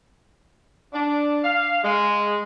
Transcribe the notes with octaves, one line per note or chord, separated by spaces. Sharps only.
D4
F5
G#3